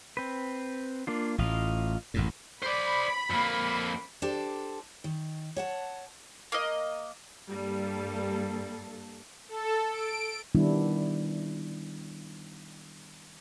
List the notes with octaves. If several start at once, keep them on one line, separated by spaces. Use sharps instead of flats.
C4 B4
A#3 D4 F4
A1 A2 F4 D#5 F5
A1 F#2 A2
C5 D5 B5
F2 A#3
D4 G4 A4 C5
D#3
C#5 F#5 A5
A#3 D#5
G2 G3 A#3 A4
A4
D7
D#3 G3 B3 D4 E4